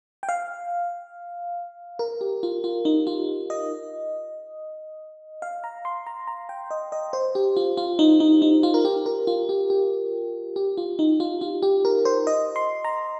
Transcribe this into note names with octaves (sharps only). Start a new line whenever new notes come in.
G5
F5
A#4
G4
F4
F4
D#4
F4
D#5
F5
A#5
C6
A#5
A#5
G5
D#5
D#5
C5
G4
F4
F4
D#4
D#4
D#4
F4
A#4
G4
A#4
F4
G4
G4
G4
F4
D#4
F4
F4
G4
A#4
C5
D#5
C6
A#5